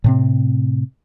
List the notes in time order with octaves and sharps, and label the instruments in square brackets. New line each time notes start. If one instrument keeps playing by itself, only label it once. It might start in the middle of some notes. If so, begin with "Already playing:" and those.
[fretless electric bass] A2 C3 C4